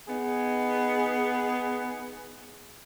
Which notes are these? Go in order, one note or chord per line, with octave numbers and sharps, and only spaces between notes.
B3 D#4 G#4